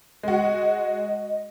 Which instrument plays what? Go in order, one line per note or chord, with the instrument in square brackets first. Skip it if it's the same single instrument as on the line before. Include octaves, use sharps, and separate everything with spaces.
[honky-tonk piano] G#3 F#4 [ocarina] D#5